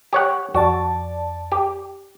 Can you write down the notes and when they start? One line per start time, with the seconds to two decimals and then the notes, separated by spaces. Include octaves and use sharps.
0.13 G4 C#5 F#5
0.54 F2 F#4 D5 A5
1.52 G4